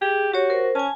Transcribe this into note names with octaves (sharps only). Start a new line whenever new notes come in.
G4 G#4
F#4 G4 C#5
A#4 C5
C#4 G#5 A5